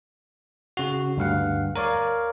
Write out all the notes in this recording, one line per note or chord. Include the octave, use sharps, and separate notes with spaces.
C#3 F#4
D2 G2 F5 F#5
A#4 C#5 D5 F5